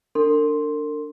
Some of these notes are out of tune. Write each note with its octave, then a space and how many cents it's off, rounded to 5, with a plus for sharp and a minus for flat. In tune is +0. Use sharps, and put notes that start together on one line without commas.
D4 +0 A#4 -45 C6 +5